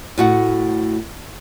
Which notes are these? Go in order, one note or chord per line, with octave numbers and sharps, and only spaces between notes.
A2 F#4 F#5